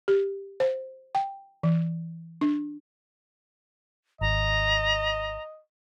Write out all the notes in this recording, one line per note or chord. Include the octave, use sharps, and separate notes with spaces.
G4
C5
G5
E3
D4
G#1 D#5 A#5